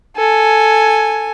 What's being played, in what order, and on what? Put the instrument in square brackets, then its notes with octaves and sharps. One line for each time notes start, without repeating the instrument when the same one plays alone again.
[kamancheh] A4 G#5